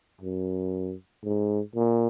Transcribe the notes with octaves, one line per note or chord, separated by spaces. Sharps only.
F#2
G#2
A#2